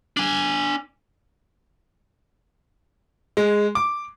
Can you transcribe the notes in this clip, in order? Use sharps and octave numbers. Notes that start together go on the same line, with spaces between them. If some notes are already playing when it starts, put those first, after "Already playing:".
D4 G#5
G#3
D6